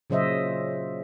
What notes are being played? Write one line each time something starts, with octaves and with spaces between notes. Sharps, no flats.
A#2 C#3 F#3 C5 D#5 E5